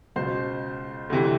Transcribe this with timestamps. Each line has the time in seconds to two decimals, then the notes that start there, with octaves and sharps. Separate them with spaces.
0.16 C#2 B2 C5
1.10 D2 C3 E3